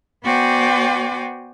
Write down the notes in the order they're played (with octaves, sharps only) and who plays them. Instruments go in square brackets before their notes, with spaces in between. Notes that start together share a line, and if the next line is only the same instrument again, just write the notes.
[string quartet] B3 F#4 C5 D5 G5 G#5